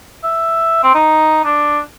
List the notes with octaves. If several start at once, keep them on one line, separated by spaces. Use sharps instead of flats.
E5
C4
D#4
D4